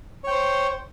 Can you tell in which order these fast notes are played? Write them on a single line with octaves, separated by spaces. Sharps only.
C#5 G5 C5